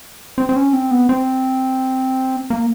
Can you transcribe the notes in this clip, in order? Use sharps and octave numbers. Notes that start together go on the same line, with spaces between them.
C4
C4
C#4
C4
B3
C4
A#3